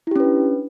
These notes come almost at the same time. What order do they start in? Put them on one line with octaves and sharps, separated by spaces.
E4 G4 C#4 B4 D4